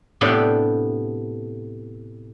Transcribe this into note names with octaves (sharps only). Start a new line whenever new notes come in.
A2 C3 B3 D4 G4 A4